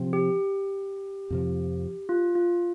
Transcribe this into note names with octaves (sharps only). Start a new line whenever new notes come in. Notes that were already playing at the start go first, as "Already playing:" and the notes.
Already playing: C3 F3 C4
G4
F2 C3 F3
F4
F4